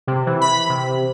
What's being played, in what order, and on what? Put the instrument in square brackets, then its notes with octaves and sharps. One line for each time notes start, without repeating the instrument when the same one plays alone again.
[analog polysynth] C3
E3
B5
C3